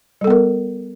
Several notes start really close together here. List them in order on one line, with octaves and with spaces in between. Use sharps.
G3 A4 B3 A#4